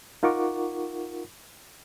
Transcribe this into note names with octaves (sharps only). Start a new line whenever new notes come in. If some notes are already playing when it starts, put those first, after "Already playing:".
D#4 F4 A#4 F#5 C#6 D6